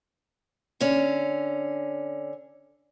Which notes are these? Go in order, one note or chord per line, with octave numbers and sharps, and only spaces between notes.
D3 C#4